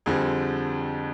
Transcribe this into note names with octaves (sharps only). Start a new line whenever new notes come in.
F2 D3 G3 C4 G#4